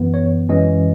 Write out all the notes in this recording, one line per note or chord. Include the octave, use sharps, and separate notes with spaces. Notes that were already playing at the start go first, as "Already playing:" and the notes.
Already playing: F#2 E3 B3
C#5
F#2 E3 G#3 C#4 D#5